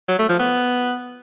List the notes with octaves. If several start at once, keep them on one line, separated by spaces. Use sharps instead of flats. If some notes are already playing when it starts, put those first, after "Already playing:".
F#3
A3
F3
B3